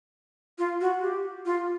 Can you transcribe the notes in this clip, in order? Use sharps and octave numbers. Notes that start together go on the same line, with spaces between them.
F4
F#4
G4
F4